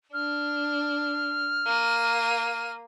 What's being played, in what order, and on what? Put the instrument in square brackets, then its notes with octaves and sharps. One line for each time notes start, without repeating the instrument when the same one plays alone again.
[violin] D4 [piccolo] F6
[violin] A#3 D#7